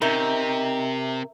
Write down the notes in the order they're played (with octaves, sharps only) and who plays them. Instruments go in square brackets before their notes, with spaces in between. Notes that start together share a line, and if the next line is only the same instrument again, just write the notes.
[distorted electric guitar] C3 [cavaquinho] D#4 [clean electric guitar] A#4 E5